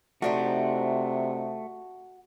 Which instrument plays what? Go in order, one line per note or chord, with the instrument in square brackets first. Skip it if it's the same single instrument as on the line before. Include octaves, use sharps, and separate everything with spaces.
[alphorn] C3 [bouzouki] F3 D4 D#4 [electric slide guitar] A3 [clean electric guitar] F#4